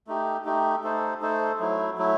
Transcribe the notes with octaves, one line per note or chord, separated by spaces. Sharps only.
A3 D#4 G4
A3 D#4 G4
A3 D#4 A4 C5
A3 D#4 A4 C5
F#3 A3 E4
F#3 A3 E4